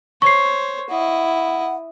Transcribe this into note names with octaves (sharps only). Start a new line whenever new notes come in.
C5 C#5 C#6 C7
E4 D#5 F#5